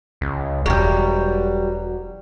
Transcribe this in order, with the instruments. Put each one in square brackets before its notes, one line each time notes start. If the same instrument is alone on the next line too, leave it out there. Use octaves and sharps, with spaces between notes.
[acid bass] C#2
[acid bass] E1 [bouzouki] F#3 G3